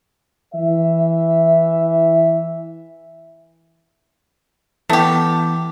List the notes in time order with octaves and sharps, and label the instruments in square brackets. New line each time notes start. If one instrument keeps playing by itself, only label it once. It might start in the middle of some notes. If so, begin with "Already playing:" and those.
[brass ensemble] E3 E5
[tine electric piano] E3 B3 A5 [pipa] A3 G4